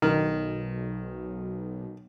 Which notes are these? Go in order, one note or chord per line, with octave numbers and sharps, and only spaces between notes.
B1 D#3